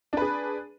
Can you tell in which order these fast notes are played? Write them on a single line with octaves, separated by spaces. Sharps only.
D4 B4 G#4